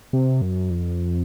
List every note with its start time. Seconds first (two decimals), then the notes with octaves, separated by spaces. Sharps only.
0.13 C3
0.42 F#2
0.70 F2